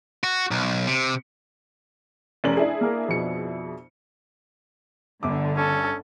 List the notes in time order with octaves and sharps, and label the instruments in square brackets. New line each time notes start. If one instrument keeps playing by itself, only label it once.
[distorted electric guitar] F#4
B1
C3
[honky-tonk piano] F1 C#4 F#7 [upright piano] D5 A#5
[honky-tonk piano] D4 E4 G#4
[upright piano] A#3 A#4
F2 B2 C#7
[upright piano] G1 D6 [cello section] D3
[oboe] C#4 [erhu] A4